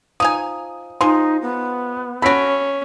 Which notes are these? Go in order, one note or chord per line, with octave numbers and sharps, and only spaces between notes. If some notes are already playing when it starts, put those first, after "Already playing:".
F3 D#4 G#5 D#6
F3 G#3 D#4 C6
B3
C#4 F#4 A4 B5 B6 D7